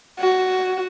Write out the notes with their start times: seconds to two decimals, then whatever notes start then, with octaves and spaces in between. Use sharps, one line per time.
0.19 F#4